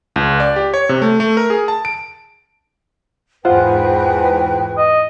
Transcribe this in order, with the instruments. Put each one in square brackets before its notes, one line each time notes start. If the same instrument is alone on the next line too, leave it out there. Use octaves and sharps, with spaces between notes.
[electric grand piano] C#2
D5
G4
C#5
C3
A3
A3
A#4
G#4
A5
D7
[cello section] E2 G#2 G#4 [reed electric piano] F4 C5 F#5 [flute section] B4 G5
[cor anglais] D#5